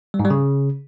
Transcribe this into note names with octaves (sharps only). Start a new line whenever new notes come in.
G3
G#2
G3
C#3